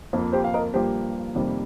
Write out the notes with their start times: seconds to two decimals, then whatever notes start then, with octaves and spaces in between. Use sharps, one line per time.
0.13 F2 F3 A#3
0.33 G4 C5
0.44 F5
0.54 A#4 D#5
0.74 G2 F3 A#3 G4 C5
1.35 F2 C3 D#3 G3 A#3